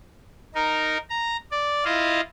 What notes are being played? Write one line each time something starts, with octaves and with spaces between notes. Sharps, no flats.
D#4 A#4
A#5
D5
E4 F4 D#5 F5